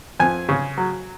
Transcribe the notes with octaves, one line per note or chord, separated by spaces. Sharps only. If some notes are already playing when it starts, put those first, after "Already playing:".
F2 G#5
C#3
F#3